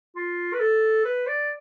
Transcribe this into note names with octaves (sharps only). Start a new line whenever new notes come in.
F4
B4
A4
B4
D5